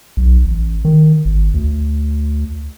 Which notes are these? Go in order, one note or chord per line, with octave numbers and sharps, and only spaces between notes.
B1
A1
D#3
G#1
D2